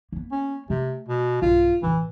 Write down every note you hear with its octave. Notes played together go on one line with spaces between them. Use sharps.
A#3 B3
C#4
C3 A3
B2
B1 G2 F4
A1 B2 E3